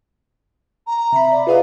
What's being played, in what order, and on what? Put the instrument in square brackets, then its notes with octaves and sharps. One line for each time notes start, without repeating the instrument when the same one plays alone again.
[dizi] A#5
[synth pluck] C3 B5 [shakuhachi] E5
[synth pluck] D5
[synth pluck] F4 G#4 D#5 [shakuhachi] B4 [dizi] F5